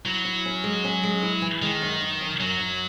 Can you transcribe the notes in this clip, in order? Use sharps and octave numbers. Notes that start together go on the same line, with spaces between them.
F#3 E4
E4
C#4
G#3
C#4
G#3
E4
E3
D#3 G#3
F#2
F#2
F#2
F#2 F#3
F#2